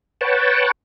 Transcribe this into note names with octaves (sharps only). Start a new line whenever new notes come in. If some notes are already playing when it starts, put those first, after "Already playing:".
B4 C#5 F#5 G5 A5